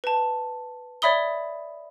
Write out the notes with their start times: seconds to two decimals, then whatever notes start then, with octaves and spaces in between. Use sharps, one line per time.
0.04 B4 A5
1.02 C#5 D5 E5 B5 D#6 G7